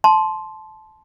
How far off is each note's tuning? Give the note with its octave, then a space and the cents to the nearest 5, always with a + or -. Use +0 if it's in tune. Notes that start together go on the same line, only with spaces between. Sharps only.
A5 -20 C6 +0